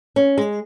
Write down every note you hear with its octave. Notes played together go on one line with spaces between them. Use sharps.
C#4
G#3